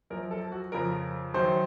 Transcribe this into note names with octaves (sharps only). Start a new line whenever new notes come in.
F#2 F3 A#4
A4
F#4
F2 C#3 F3 A#4
F#2 D#3 F#3 C5